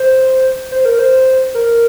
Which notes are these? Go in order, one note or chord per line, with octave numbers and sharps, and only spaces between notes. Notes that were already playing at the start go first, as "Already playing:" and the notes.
Already playing: C5
C5
A#4
C5
A#4